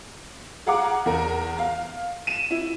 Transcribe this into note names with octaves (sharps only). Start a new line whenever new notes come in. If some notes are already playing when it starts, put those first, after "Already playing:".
G#4 F5 F#5 A#5 D6
E2 A#4
F5
D#7 E7
E4